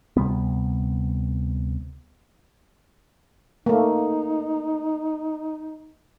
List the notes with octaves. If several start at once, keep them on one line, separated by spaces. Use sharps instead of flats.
D2 C3 G3 B3
A3 A#3 D#4